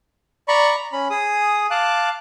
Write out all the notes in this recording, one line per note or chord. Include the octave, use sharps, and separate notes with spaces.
D5 A#5 B5 C#6
A#5
C#4 B5
G#4 D#6
F5 A5 D6 F#6